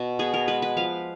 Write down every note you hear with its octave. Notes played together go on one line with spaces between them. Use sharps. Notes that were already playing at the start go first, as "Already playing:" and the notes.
Already playing: B2
B3 G#4
A#4
G#3 B4
B4
F3 F5